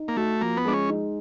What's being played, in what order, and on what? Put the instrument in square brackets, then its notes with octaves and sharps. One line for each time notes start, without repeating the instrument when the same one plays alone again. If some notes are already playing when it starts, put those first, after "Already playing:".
Already playing: [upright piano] D#4
[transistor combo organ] A#3
[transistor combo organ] A3 [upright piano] F#4
[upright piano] F3 [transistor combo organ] A#3
[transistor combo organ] B3
[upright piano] G#3 [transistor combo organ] D4
[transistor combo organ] C#4
[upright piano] D#4